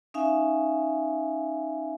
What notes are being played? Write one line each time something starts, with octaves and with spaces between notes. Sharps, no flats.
C#4 D#4 E5 F5 G#5